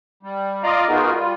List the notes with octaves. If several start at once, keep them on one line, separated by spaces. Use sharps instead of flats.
G3
F4 D5 D#5 F5 A#5
B3 D#4 F4 F#4 G#4 A#4
G3 F4